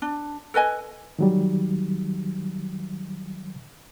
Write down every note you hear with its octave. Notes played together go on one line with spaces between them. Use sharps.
D4
A4 B4 D#5 G#5
D#3 F#3 G3